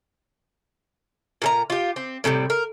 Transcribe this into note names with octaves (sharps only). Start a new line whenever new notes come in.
A#2 A4 A#5
F4 G4
C4
A2 C3 E3 G3
A#4